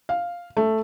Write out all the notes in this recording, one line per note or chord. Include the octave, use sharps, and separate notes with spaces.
F5
A3